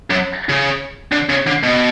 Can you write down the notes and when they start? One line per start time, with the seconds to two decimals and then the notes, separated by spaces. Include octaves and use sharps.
0.11 F#2
0.49 C#3
1.12 D3
1.30 C#3
1.47 D3
1.64 B2